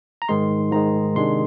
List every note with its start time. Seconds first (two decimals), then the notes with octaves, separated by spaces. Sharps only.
0.22 A#5
0.29 G#2 D#3 G#3 C6
0.72 G#2 D#3 G#3 A#5
1.15 C3 D#3 G#3 D4 C6